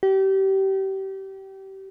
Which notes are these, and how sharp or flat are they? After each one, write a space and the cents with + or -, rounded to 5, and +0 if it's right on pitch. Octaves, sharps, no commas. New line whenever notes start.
G4 -30